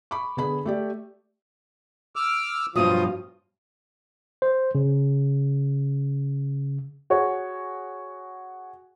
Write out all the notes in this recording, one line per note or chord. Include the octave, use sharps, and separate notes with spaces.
B5 C#6 D6
D3 B3 G#4 B5
A3 G4 D5
D6 E6 F6
G2 B2 F3 F#3 F4 D#6
C5
C#3
F#4 G#4 C#5